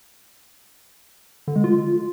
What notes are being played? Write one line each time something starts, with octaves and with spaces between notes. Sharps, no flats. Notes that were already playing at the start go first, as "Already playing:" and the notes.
D3
G#3
F4